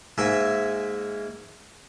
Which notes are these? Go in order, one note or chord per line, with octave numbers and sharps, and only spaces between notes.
G#2 A#3 E5 G#5